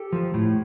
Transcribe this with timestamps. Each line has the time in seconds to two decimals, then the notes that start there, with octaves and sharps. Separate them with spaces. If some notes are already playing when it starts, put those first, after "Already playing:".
Already playing: G4 A4
0.13 F3
0.34 A2